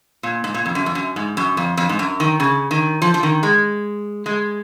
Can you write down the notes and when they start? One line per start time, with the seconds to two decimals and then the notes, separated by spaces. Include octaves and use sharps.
0.23 A#2
0.44 G#2
0.54 A#2
0.66 F2
0.75 F#2
0.86 F2
0.95 F#2
1.16 G#2
1.37 F#2
1.57 F2
1.77 F2
1.89 G#2
1.99 F#2
2.20 D#3
2.40 C#3
2.71 D#3
3.02 F3
3.14 F3
3.23 D#3
3.43 G#3
4.26 G#3